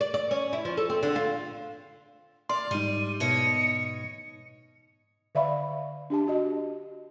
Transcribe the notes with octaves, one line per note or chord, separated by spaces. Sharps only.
D5
D5
C#4
E4
F3
A4
C4
D3
F4
D5 C6 F6
G#2 G3 D#4 D#7
B2 C#5 D#5 C#7
D3 D5 E5 F5 B5 C#6
D4 G4 A5
F#4 D#5